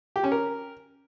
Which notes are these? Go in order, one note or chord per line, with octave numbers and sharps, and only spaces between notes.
G4
C#4
A#4